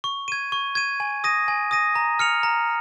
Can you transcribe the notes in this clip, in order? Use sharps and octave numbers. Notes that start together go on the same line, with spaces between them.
C#6
G#6 D#7
C#6
G#6 D#7
G#5
D#6 A#6 D#7
G#5
D#6 A#6 D#7
A#5
F6 C#7 F7
A#5